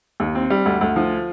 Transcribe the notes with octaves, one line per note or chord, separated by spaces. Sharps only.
D#2
C4
G3
D2
D2
F3